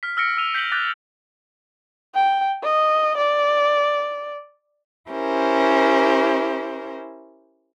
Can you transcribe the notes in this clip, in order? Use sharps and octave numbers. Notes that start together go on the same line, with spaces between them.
F6 B6
E6 F6 A#6 C#7 D7
E6 D#7 F7 G7
G6 B6 C#7 F#7 G7
D6 F#6 G6 A6 A#6 G7
G5
D#5
D5
C#4 E4 G4 A#4 C5